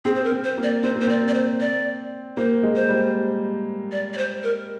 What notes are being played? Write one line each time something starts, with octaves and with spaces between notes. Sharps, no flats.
C4 G#4
C5
A#4
C4
C5
A#3
D5
C4 C5
A#3 C5
C4 D5
D5
C5
D5
A#3 C5
G#3
C5
G3
D5
D5
C5
A#4